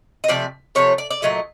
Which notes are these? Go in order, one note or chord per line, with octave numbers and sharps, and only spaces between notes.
D#5
C3 F3 A3 D5
C3 F3 A3 C#5
D5
D5
A#2 F#3 A3 D#5